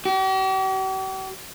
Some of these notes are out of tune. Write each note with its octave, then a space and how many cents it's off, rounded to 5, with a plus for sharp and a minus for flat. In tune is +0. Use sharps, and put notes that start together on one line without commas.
G4 -45